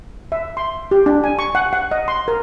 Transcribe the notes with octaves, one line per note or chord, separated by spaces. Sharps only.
E5
C6
G4
D4
G#5
C#6
F#5
F#5
D#5
C6
A#4